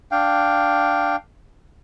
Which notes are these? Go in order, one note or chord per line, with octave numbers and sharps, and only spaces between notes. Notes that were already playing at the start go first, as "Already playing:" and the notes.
D4 F5 G5